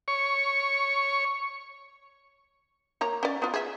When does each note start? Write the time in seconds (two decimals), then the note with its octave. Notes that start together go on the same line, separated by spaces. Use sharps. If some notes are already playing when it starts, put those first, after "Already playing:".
0.08 C#5 C#6
3.01 A#3 C#5 A#5
3.23 C#4 D5
3.42 B3 F4
3.54 G#4 E5